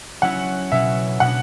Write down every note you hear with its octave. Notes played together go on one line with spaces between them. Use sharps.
F#3 C#4 E4 F#5
B2 F#3 C#4 E5
B2 G#3 B3 D4 F#5